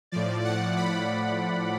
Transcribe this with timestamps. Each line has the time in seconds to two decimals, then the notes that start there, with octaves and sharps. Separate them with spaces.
0.12 A2 F3 D5
0.44 F#5
0.76 B5